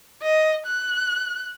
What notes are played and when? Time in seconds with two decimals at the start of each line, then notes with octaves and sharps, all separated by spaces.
0.23 D#5
0.66 F#6